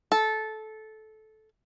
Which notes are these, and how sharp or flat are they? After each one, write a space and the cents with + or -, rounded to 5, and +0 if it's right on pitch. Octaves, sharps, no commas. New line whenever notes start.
A4 -15